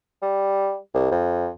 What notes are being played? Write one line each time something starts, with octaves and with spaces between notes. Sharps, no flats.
G3
C2
F2